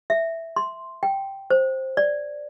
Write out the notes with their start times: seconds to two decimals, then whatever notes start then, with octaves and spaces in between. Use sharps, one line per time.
0.10 E5
0.56 C6
1.03 G5
1.50 C5
1.97 D5